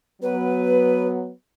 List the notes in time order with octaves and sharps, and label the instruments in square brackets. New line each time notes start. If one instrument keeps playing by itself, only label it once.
[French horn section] F#3 B3 [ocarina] B4